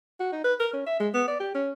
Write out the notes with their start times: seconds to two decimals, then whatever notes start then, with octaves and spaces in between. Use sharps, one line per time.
0.20 F#4
0.32 D#4
0.44 B4
0.60 A#4
0.73 C#4
0.86 E5
1.00 G#3
1.14 B3
1.28 D5
1.40 G4
1.55 C#4